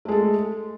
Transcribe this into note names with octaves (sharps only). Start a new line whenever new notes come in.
G#3 A3 A4